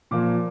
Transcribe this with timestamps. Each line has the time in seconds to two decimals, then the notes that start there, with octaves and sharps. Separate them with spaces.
0.11 A#2 F3 A#3 D6